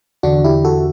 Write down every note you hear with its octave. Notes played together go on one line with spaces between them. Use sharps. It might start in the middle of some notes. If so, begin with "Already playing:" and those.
E2 D3 D4 F#4
E4 G4
F#4 A4